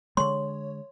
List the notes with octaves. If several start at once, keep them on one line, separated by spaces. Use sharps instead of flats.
D3 G#3 C#5 C6